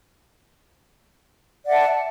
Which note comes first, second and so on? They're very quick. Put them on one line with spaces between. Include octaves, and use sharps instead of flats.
D5 F#5 E5 A5